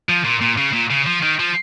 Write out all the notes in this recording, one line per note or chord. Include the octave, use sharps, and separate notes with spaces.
F3
A#2
A#2
C#3
A#2
C#3
F3
D#3
F3